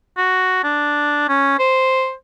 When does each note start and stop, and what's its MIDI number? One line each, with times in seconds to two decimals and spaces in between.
0.17 0.63 66
0.64 1.27 62
1.29 1.58 61
1.59 2.13 72